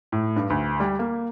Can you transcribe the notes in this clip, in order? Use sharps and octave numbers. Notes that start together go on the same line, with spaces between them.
A2
G2
D2
G3
A#3